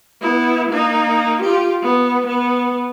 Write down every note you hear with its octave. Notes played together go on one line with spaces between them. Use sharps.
B3 E4
A#3 D#4
F4 G4
B3
B3